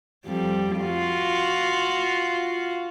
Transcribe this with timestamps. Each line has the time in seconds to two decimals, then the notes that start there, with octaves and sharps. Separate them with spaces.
0.25 F2 G3
0.80 F4 F#4